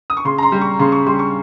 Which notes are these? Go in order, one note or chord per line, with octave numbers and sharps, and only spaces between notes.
D#6
C#6
C#3 C6
A#5
C6
G3
C#6
C#3 C6
C#6
G3 C6
C#6